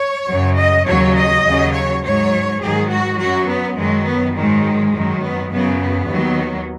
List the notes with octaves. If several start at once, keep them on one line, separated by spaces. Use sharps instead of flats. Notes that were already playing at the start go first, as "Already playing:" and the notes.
Already playing: C#5
F#2 C#3 F#3
D#5
D#2 C#3 F#3 C#5
D#5
D#2 C#3 F#3
C#5
G#2 F#3 C#5
G#2 D#3 F#3 G#4
F#4
F#2 F#3 F#4
B3
F#2 D#3 F#3 G#3
B3
G#2 D#3 F#3 G#3
F#2 D#3 F#3
B3
F#2 C#3 F#3 B3
B3
D#2 D#3 F#3